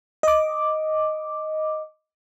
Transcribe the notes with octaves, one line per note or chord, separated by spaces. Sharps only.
D#5 D6